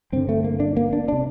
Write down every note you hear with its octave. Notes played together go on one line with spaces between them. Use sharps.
G2 D3 C4
A3
A#3
D4
A#3
D4
C3 D4